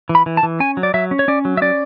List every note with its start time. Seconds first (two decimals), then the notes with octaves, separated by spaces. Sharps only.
0.09 E3
0.15 B5
0.26 E3
0.37 A5
0.43 E3
0.60 C#4 G#5
0.77 F#3
0.83 D5
0.94 F#3 E5
1.11 C#4
1.19 C#5
1.28 C#4 D5
1.45 F#3
1.57 E5
1.62 C#4 D5